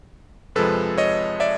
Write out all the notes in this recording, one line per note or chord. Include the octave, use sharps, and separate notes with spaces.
F2 C3 F3 G#3 A4 B4
C#5 D#5
D5 E5